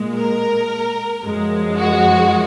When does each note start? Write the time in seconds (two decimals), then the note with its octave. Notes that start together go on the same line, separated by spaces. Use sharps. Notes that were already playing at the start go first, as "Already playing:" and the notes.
Already playing: A#2 G#3
0.14 A#4
1.23 F#2 F3 G#3
1.78 F#4